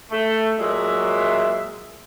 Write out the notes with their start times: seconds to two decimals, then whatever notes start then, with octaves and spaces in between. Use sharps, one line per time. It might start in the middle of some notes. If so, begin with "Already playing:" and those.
0.11 A3
0.58 A#2 F#3 G#3 E5